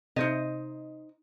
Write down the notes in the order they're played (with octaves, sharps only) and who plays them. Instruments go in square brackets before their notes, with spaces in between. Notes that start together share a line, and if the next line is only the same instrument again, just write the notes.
[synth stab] C3 [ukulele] D#4 C5 D#5